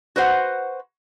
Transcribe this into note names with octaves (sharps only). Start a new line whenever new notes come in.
F#4 B4 C5 F#5